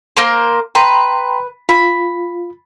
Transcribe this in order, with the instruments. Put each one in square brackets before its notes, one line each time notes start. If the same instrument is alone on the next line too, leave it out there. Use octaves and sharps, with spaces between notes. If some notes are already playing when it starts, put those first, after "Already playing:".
[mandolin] A#3 A#4 C5
[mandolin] B4 [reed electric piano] G5 A#5 C6
[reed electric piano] F4 [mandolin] B5